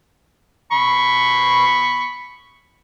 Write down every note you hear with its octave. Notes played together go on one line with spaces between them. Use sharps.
B5 C#6